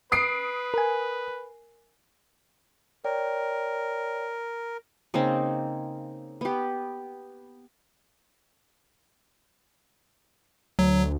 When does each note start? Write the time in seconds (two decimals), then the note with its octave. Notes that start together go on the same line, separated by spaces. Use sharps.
0.12 B4 D#6 C7 D7
0.74 A#4 G#5
3.04 A#4 C#5 D5 G5
5.14 C#3 A#3 C4 D#4
6.41 B3 G4
10.79 D2 F#3